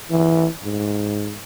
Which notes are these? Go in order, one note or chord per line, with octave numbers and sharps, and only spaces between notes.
E3
G#2